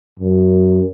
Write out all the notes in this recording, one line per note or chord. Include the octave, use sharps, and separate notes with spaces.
F#2